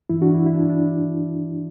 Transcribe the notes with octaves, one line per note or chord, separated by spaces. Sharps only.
G2 E3 E4
D4 F#4
E4
E4
D4
D4